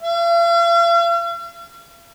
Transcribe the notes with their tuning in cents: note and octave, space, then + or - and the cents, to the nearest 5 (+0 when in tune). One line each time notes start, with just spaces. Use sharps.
F5 -45